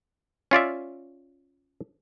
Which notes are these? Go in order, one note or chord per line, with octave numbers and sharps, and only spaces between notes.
C#4 F4 D5 E5